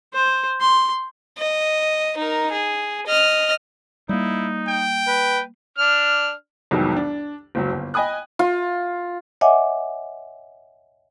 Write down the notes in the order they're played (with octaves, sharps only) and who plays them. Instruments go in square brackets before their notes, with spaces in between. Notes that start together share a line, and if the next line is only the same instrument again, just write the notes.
[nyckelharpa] C5
C6
[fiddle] D#5
D#4 A#4
G#4
D#5 F6
[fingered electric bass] G3 A#3 [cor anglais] D#4 [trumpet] E4
[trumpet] G5
[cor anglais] B4
[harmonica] D4 F6
[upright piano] C2 F2 D#3 F#3 G#3 B3
D4
F#1 C#2 F#3
G1
D#5 G5 G#5 B5 D#6 F#6
[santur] F4
[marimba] C#5 D#5 E5 F#5 G#5 D6